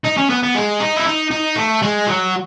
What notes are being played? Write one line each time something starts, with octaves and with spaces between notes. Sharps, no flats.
D#4
C#4
B3
B3
G#3
D#4
E4
D#4
D#4
A3
G#3
F#3